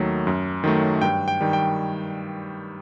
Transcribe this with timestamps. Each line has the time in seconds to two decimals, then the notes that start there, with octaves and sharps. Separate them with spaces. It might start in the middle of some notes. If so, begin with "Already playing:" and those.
Already playing: D#2 D#3 F#3 A3
0.27 F#2
0.64 D#3 F#3 A3
1.01 G2 G5
1.28 G5
1.41 D#3 G3
1.53 G5